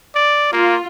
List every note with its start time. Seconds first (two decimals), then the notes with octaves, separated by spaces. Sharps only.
0.15 D5
0.53 A#3 F4